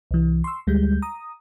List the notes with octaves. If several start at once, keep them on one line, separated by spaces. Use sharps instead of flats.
C2 E3
C6 C#6 E6
D2 G3 G#3 G6
A#5 D#6